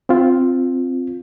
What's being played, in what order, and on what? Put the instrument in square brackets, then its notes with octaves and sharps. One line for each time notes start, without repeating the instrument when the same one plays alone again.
[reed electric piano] C4 F4